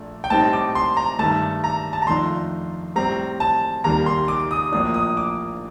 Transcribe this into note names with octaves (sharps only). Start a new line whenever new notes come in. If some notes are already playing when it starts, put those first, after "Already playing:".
Already playing: A#1 A#2 A3 D4
G5
A2 G3 C4 D#4 A5
D6
C6
A#5
G2 D#3 A3 A5
A#5
A5
A#5
F2 D#3 A3 D4 F4 C6
A2 G3 C4 A#5
A5
D#2 D#3 G3 A#3 A#5
C6
D6
D#6
A#1 A2 F3 A#3 D4 D#6
D#6
D6